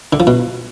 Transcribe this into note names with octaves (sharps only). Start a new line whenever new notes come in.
D3
F3
B2